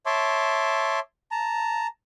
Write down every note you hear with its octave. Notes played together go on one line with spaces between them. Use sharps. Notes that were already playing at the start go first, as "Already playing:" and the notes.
C#5 E5 A5 C6 D6
A5 A#5